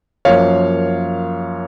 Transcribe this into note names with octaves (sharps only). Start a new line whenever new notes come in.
F#2 F3 A#3 C#5 F5